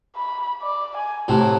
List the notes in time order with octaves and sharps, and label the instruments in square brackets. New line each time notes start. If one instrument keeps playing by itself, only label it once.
[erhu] B5
D5
G#5
[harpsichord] A2 C3 F#3 [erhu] A5